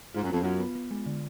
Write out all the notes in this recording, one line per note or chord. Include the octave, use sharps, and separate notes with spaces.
G#2 F4
F#2
F2 B3
F#2 F4
B3
B3
G#3
D3